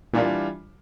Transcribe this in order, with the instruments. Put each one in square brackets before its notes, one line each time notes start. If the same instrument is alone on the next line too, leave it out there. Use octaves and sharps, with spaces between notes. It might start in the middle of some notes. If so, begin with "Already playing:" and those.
[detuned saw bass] A#2 [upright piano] E3 G3 D4 F4